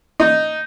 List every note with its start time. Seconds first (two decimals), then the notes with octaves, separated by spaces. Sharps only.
0.20 D#4